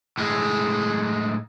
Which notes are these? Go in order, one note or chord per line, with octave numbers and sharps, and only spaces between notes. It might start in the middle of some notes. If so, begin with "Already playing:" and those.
A2 G#3